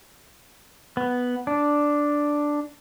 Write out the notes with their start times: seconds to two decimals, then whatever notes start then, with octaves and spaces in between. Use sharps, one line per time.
0.97 B3
1.47 D4